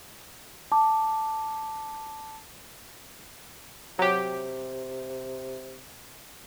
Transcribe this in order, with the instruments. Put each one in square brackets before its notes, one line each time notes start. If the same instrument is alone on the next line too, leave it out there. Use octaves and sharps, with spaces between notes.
[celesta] A5 D6
[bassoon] C3 [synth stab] F#3 G4